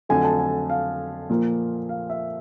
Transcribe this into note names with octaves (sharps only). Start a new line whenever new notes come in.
F2 D3 F#3 A3 G#5
A5
G#5
F5
A#2 F3 A#3
F5
E5